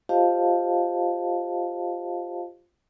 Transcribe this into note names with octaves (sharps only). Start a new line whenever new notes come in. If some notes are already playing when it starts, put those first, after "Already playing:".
F4 G4 C5 D#5 F5 A5